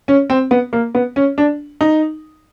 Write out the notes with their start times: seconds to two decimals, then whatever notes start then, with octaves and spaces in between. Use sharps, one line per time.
0.08 C#4
0.30 C4
0.51 B3
0.73 A#3
0.95 B3
1.16 C#4
1.38 D4
1.81 D#4